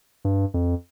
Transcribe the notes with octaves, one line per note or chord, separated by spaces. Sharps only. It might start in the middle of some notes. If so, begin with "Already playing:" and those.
G2
F2